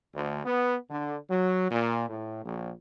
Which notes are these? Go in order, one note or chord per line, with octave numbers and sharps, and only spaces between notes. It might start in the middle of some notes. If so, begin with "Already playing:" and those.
D2
B3
D3
F#3
A#2
A2
A#1